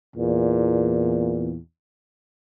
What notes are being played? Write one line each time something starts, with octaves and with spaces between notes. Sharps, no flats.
E2 A#2